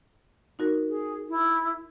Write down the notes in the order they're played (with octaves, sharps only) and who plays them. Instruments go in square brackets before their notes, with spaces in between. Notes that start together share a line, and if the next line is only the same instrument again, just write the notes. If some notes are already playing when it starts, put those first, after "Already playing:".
[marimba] D#4 F#4 A#4
[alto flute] G#4
E4